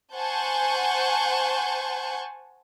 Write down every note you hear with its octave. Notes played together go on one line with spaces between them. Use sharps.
C5 F#5 G#5 A5 C#6 G6